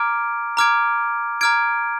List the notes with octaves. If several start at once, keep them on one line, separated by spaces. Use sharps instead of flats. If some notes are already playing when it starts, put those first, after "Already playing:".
Already playing: A#5 D6 F6 G#6 D7
A#5 D6 F6 G#6 D7
A#5 D6 F6 G#6 D7